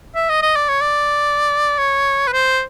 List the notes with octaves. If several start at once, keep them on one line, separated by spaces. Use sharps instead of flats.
E5
D#5
D#5
D5
C#5
D5
C#5
B4
C5